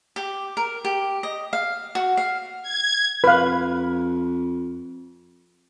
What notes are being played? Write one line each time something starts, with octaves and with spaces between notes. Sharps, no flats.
G4
A#4
G4
D#5
F5
F#4
F5
G#6
F2 B4 F5